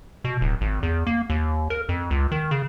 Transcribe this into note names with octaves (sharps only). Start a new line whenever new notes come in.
B2
D1
G#1
E2
A#3
D#2
A#4
F2
C#2
D#3
C#3